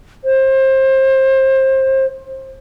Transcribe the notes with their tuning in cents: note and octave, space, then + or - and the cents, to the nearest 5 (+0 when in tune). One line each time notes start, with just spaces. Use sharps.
C5 +25